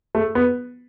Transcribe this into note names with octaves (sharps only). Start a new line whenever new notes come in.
A3
B3